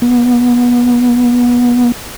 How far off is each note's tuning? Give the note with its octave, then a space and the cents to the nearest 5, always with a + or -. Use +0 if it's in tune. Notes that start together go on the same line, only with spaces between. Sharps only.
B3 -25